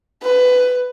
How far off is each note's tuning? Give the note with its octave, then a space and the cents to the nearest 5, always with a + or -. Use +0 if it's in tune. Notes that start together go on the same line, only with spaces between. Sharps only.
B4 +15